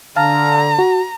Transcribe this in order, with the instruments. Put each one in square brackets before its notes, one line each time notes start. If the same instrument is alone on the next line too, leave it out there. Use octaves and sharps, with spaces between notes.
[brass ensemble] D3 [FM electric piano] F5 A5 F6 [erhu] A#5
[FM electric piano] F#4